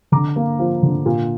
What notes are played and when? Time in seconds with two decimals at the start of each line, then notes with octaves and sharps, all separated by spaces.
0.12 D3 A#5 D6
0.36 A#3
0.59 F3
0.83 D3
1.06 A#2